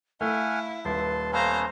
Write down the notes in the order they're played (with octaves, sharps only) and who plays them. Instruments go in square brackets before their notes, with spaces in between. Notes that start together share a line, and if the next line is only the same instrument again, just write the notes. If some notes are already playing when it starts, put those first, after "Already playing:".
[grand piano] A3 [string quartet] E4 [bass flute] F5 [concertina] F#5 G#5 F6
[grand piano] D#1 [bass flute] B4 [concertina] A5 C6
[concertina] A3 B3 C#4 [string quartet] C5 F5 A#5